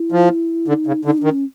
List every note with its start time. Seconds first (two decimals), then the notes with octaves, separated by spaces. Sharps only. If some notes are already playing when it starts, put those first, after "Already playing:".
Already playing: E4
0.12 F3
0.68 D3 D#4
0.87 C#3
1.05 D3 D#4
1.18 D4
1.24 D#3
1.31 C#4